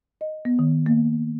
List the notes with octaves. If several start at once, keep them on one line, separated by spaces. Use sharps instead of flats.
D#5
B3
D#3
A#3